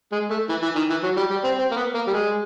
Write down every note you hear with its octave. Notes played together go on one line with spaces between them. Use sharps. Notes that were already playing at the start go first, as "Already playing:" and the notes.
G#3
A3
E3
E3
D#3
E3
F#3
G3
G3
C4
C4
A#3
B3
A#3
G3
G#3